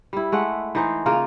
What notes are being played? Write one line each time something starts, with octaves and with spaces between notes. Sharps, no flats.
G3 E4
G#3 A3 F#5
E3 D#4 C5
C#3 A#3 F4 A#4